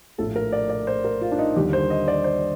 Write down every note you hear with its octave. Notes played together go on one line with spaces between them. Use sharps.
A#1 A2 F3 A4
A#4
D5
D5
C5
A#4
F4
D4
D#4
D#2 D3 G3 G4
C5
D#5
D5
C5